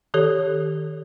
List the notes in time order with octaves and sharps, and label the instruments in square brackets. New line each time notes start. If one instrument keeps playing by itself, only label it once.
[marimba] D#3 G4 A4 C#5